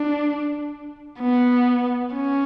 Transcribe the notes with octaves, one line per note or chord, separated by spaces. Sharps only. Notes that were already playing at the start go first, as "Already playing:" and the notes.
Already playing: D4
B3
C#4